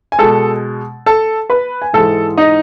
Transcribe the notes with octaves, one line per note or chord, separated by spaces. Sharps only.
G#5
B2 G#3 A4 A5
A4 A5
B4 B5
G#5
G#2 E3 G#3 A4 A5
D#4 D#5